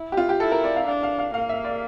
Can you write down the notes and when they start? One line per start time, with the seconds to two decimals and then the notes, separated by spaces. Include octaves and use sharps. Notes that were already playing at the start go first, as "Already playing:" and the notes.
Already playing: E4
0.12 G4
0.17 F4
0.29 G4
0.40 E4 A4
0.52 A#4
0.64 D5
0.76 F5
0.87 D4 F5
1.03 F5
1.18 F5
1.34 A#3 F5
1.49 E5
1.65 D5